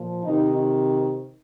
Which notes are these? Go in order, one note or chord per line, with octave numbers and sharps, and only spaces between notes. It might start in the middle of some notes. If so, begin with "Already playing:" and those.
Already playing: A#2 F3
C3 D#3 D#4